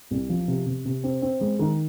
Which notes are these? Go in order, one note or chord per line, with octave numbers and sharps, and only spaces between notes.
C2
F3
C3
C3
C3
C4
C4
G#3
D#3